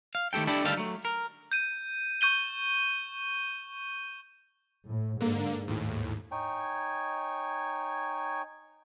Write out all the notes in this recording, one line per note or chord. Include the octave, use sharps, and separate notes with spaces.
F5
D#3 A3 G4 A4 G5
D4 E4 G4 A4
D2 D#3 G3 A4 F5
F#3 A3
A#4
G6 D#7
C#6 G6 D#7 G7
A2
G#2 D3 A#3
D#2 A2
D#4 C#5 G5 G#5